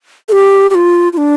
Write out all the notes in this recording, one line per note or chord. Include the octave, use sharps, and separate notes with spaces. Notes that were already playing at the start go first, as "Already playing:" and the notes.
A4
G4
G4
F4
F4
D4